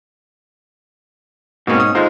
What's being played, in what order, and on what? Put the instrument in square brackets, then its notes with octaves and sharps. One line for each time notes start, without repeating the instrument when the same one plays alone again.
[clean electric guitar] G#2 C#4 [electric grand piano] B2 A#3 C4
[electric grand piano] D#6
[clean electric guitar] D3 G#3 [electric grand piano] D#4 F4 C5